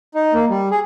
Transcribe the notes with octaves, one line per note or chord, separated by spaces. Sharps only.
D#4
A#3
G3
G#4